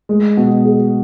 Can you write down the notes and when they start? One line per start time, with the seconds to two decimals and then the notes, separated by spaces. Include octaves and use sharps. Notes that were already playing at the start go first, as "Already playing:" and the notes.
0.09 G#3
0.37 B2
0.65 G#4